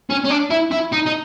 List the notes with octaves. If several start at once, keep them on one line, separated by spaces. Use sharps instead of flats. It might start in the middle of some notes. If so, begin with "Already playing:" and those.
C#4
C#4
D4
E4
E4
D#4
D#4